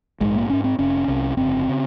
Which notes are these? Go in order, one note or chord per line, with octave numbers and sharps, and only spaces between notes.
A#1 G#2 G#3
A#3
G#1 G#2 C#4
C4
F1 F2 C3 C#4
C2 C3
G1 F2 C#3 C4
C#3